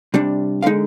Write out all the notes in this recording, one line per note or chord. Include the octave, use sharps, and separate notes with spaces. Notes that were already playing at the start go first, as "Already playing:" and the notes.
C3 G3 D4
D3 G#3 D#4 F5